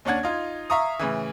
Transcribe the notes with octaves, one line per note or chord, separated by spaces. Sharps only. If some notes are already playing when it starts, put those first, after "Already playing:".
D#2 C#4 D4 F#5 G#6
D#4 F4
E5 F5 A#5 C#6 D#6
A2 C#3 E3